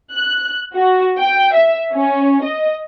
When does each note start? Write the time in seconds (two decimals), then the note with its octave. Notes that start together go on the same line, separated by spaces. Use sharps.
0.12 F#6
0.74 F#4
1.18 G5
1.54 E5
1.93 C#4
2.43 D#5